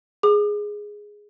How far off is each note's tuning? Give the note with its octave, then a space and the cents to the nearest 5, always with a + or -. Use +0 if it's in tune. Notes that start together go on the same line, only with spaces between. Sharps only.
G#4 +0 D6 +35